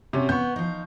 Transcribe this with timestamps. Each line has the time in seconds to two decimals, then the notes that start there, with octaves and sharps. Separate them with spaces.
0.13 C3 C#4 F#4
0.29 B3 C#6 G6
0.56 F3 D#4